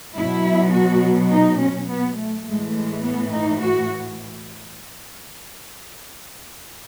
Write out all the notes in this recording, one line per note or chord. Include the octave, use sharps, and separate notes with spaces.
B2 F#3 E4
F#4
D#4
C#4
B3
A3
A2 E3 G#3 A3
G#3
B3
D#4
F#4